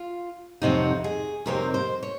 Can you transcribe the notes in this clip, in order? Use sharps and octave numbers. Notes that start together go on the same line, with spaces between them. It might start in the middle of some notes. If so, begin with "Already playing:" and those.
Already playing: F4
F2 C3 F#3 C4 D#4 F#4
G#4
F2 C3 F#3 C4 D#4 A#4
C5
C#5